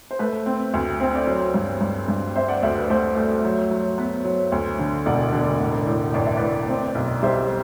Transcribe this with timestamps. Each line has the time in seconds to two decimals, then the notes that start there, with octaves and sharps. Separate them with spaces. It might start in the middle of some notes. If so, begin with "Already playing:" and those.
0.11 C5
0.19 A3 B4
0.46 C4
0.74 D2
1.00 C4
1.15 D5
1.27 F#3 C5
1.54 G2
1.81 G2
2.08 G2
2.36 C4 C5 E5
2.48 D5 F#5
2.63 D2 C5 E5
2.76 B4
2.90 A3 C5
3.17 A3
3.44 F#3
3.71 F#3
3.98 B3 B4
4.25 F#3
4.52 D2
4.79 D3
5.06 E1 D5 F#5
5.33 D3
5.60 A1
5.87 A2
6.14 A1 D5
6.26 E5
6.37 A2 B4 D5
6.69 C4
6.95 B1
7.23 G3 C5 E5